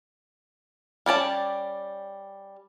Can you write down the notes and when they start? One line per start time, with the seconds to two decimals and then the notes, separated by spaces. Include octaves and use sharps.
1.06 G3 C#4 D5 A5